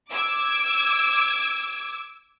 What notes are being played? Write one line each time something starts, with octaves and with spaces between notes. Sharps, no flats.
D6 E6 G#6